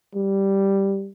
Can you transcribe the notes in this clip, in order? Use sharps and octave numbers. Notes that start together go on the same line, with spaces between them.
G3